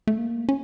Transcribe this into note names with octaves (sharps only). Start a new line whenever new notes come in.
A3
A#3
C#4